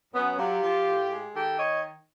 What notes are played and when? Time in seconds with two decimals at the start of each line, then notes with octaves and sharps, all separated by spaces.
0.14 F#2 B3 C#4
0.38 F#3 F4 G4
0.63 F3
0.86 A2
1.11 G#3
1.34 D#3 G4 A4
1.59 C#5 D#5